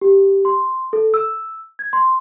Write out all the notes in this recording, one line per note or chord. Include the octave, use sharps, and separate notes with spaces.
G4
C6
A4
E6
G#6
C6